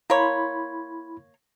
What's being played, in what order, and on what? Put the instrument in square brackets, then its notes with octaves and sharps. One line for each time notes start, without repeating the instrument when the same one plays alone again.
[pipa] A#3 C#5 [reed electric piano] E4 B5 C6